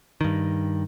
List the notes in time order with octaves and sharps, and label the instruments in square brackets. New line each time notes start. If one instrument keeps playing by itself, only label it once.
[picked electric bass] G2 D#3